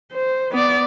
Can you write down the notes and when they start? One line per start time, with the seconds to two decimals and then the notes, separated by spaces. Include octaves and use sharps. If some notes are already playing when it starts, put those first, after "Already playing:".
0.12 C5
0.51 B3 D5